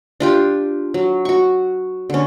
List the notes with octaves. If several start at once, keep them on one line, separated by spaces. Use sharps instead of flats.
D4 F4 G4
F#3
F#4 C#6
D3 C#4